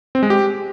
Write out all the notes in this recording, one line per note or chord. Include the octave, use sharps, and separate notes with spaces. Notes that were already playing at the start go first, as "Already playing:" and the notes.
C4
G#3
G4